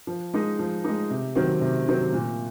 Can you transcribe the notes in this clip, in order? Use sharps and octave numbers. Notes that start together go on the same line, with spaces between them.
F3
G#3 D#4
F3
G#3 D#4
C3
D#3 F#3 C4
C3
D#3 F#3 C4
A#2